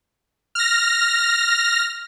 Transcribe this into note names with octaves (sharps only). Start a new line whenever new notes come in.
F6 A#6